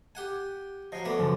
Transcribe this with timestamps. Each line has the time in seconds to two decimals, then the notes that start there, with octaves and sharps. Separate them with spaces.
0.15 G4 F#5 G#5
0.92 F3 F#3 D#5 C7
1.05 A3 B3 B4 D5 D6
1.18 F#2 C#3 F3